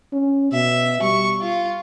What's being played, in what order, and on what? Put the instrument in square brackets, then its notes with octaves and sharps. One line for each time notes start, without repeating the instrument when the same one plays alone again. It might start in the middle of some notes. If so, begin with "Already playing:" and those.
[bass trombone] C#4
[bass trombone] B2 [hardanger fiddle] E5
[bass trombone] G3 [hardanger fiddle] C#6
[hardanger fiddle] F4